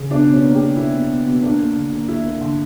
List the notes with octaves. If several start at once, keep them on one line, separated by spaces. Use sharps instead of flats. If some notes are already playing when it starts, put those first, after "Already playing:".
Already playing: C#3
B2 D4
B2
C#4
A#3
G4
B2
A#3 E4
B2
B2
B2
A#3 D4
A#3
D3
A#3
A#3 E4
A#3
D3